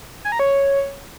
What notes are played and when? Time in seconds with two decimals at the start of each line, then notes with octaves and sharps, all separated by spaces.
0.25 G#5
0.32 A#5
0.39 C#5